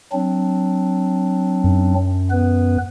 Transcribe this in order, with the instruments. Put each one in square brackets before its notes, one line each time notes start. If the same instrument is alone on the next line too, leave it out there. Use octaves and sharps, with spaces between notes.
[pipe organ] F#3 C4 D4
[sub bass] F#2
[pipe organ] B3 B4